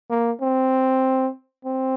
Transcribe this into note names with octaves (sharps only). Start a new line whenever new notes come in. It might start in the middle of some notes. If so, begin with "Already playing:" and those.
A#3
C4
C4